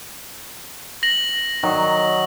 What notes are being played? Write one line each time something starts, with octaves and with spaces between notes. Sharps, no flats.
A#6 F#7
D#3 F#3